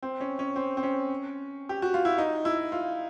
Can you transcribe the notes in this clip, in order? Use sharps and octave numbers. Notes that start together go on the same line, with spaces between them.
C4
C#4
C#4
C4
C4
C#4
G4
F#4
F4
E4
D#4
E4
F4